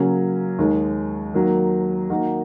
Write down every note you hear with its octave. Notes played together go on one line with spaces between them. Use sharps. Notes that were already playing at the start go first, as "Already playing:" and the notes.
Already playing: C#3 F#3 A#3 C#4
D#2 D#3 G#3
D#3 F#3 A#3
D#3 A#3 D#4 F#4